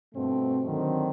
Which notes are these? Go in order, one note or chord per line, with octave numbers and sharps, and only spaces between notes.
G2 B2 A3 C4
D3 D#3 F#3 C4